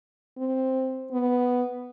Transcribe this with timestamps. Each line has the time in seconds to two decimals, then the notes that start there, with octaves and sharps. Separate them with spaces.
0.37 C4
1.12 B3